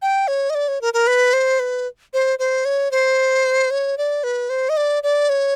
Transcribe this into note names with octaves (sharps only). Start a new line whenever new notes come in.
G5
C#5
D#5
D5
C#5
A#4
A#4
B4
C5
B4
C5
C5
C#5
C5
C#5
D5
B4
C5
D#5
D5
D5
C#5